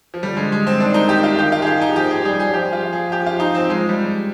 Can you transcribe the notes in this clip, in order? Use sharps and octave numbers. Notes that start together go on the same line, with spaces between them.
F3
D3 G3
G#3
G#3
C4
D#3 D4
D#4
G4
F4
D#3 G4
F4
G#4
G4
D#4
F3 G4
G#4
G3 G#4
G#4
F3 G4
F4
G#4
G4
F4
D#4
C4
G#3
G3